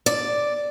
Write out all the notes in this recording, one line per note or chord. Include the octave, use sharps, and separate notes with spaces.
D5